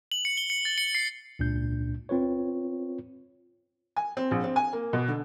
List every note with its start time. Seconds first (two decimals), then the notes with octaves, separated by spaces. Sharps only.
0.12 F#7
0.25 C#7
0.37 G7
0.50 C#7
0.65 A6
0.78 C#7
0.95 C7
1.39 C#2 A#2 D4 G6
2.09 C4 F4 B4 C#5
3.96 G#5
4.17 C4
4.31 A#1
4.44 C4
4.56 G#5
4.73 A#3
4.93 B2
5.08 D3